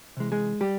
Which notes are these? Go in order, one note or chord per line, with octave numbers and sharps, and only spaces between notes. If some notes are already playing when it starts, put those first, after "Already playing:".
C3 E3 G#3
G#3 G#4
G3 G4